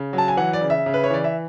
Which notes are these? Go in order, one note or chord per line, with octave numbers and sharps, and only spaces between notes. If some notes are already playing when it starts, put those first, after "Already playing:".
Already playing: C#3
F#3
A5
G#5
E3 F#5
D5
C#3
E5
C#3
B4
C#5
E3 D5
E5